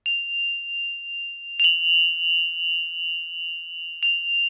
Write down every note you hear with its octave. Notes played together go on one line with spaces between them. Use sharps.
F7
F7
F#7
F7